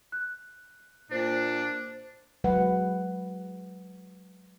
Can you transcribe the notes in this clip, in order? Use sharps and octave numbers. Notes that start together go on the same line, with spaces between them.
F#6
A#2 D4 C5
F#3 G#3 B4 F#5